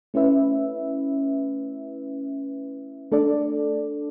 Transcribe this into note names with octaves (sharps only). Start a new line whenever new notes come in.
A3 C#4 E4 B4 E5
A3 D4 A4 D5